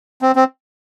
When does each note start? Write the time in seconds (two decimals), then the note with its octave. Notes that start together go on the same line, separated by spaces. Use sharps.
0.22 C4
0.36 C4